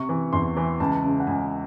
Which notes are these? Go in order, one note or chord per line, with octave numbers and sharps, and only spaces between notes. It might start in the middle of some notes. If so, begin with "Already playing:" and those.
Already playing: C3 C#6
E3
E2 C6
E3
C#2 A5
C#3
F#5
C#2 G#5